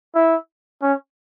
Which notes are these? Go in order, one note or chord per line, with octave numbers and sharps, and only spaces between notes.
E4
C#4